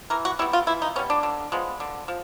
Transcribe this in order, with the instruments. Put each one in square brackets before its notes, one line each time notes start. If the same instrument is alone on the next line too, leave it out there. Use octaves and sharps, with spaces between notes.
[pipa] E3 A#4
F#4
G3 B3 E4
F4
E3 E4
D#4
B3 C#4
G3
D4
D3
F3 G#3 B3
D3
F3